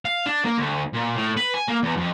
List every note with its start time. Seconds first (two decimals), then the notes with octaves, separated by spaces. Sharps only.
0.05 F5
0.26 D4
0.45 A#3
0.58 D2
0.94 A#2
1.16 A2
1.37 B4
1.54 G#5
1.68 A#3
1.83 E2
1.97 F2